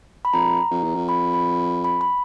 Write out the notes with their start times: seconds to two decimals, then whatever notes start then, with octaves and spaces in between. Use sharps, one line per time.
0.25 B5
0.33 F2 A#5
0.71 F2
0.83 E2
0.95 F2
1.09 B5
1.34 B5
1.84 B5
2.01 B5